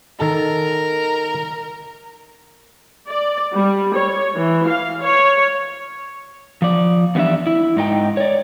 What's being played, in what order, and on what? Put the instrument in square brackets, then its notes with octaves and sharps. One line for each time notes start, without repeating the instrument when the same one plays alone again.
[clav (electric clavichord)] D#3 A4 A5 [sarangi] A#4
[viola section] D5
G3
C#5
E3
F5
C#5
[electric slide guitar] F3 D5
E2 E3 G3 D4 E5
E4
G#2 D#4 G5
C#5 D5